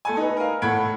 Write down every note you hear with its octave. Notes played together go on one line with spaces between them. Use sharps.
A3 A4 G#5
D#4 B4
A#4 F5
A2 A4 F#5 B5 G#6 D7